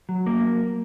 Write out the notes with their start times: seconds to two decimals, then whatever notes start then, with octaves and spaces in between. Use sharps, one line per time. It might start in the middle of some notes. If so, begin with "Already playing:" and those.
0.09 F#3
0.27 A#3